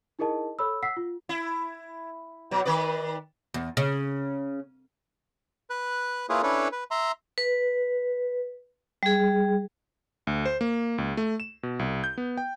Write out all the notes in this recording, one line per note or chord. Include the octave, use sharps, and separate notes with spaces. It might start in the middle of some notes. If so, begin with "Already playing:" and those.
D#4 E4 G#4 A#4 D#5 A5
A4 C#5 B5 E6
F#5 E6 B6 C7
F4
E4
B2 F#3
D#3 B4 D5
E2
C#3
B4 F#6
A#3 E4 F4 G#4 B4 C#5
C#4 D4 E4 A4 B4 C#5
B4
E5 A#5 C6
B4
G3 G#4
D2
C5
A#3
C#2
A3
E7
B2
C2
G6
B3
G5